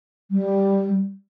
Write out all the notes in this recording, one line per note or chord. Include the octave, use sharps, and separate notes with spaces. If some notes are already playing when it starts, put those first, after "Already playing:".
G3